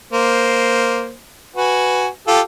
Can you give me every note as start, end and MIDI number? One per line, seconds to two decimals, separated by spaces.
0.13 1.13 58
0.13 1.13 72
1.56 2.07 66
1.56 2.07 71
1.56 2.07 80
2.27 2.40 65
2.27 2.40 67
2.27 2.40 69